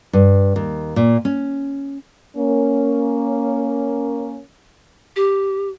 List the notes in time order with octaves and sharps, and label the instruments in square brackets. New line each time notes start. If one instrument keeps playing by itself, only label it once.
[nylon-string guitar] G2
D#2
A#2
C#4
[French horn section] A#3 C#4
[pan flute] G4